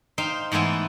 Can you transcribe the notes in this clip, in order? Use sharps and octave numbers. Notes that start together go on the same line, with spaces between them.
D#4 C5 F5 G5
G#2 E3 A3 B3 E4